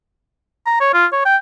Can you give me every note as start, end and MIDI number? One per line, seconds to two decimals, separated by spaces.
0.66 0.80 82
0.80 0.90 73
0.94 1.06 65
1.12 1.22 73
1.25 1.36 79